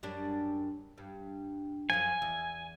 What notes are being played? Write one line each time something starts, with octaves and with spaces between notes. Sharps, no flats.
F#2 G3 D4
G2
F#2 F3 G#5
E2